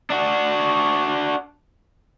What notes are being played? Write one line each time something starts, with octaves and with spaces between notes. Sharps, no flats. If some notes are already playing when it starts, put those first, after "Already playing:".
D4 F#4